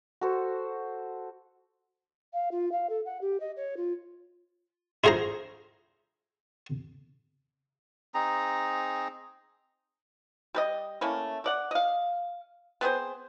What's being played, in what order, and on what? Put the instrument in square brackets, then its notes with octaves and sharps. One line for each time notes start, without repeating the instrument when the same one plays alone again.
[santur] F#4 A4 C5
[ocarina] F5
F4
F5
A4
F#5
G4
D#5
C#5
F4
[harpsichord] E4 F4 G#4 C5 A#5
[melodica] C4 D#4 G#4 A#5
[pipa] G3 B4 D#5
A3 A#3 C#4 E4
A3 D5 F#5
D#5 F5
B3 C4 G#4 C5